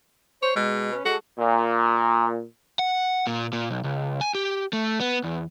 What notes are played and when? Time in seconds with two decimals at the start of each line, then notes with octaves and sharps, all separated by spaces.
0.43 C5 C#5
0.56 B2 G#3
0.92 C#4 B4
1.05 G#3 F#4 A4
1.39 A#2
2.79 F#5
3.27 A#2
3.53 A#2
3.71 B1
3.84 C#2
4.21 G#5
4.35 G4
4.73 A3
5.00 B3
5.24 E2